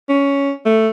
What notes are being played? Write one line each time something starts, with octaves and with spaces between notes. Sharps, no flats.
C#4
A3